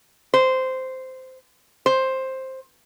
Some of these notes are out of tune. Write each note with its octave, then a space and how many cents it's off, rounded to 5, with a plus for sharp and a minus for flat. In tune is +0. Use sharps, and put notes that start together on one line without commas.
C5 -10
C5 +10